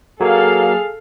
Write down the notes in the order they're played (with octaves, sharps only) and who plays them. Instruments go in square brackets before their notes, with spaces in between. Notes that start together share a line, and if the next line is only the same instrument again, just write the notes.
[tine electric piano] F#3 A#3 [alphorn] G#4 [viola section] A4 F5